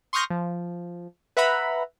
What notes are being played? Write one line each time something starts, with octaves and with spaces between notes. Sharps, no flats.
C6 C#6 D#6 F6 G6 A#6
F3
B4 E5 F#5 A#5 B5